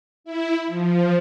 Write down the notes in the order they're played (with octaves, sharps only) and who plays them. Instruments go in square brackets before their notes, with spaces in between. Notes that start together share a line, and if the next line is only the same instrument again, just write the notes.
[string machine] E4
F3